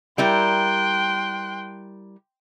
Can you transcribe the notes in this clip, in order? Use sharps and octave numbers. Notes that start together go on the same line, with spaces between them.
G3 E4 A#4 G5 C6 F#6